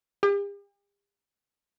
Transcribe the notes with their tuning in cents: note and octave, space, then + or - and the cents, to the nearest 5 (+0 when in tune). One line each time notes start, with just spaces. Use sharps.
G4 +45